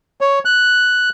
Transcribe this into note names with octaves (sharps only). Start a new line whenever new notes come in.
C#5
F#6